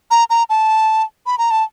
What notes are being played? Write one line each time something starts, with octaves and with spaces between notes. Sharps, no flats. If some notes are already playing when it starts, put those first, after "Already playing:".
A#5
A#5
A5
B5
A#5
A5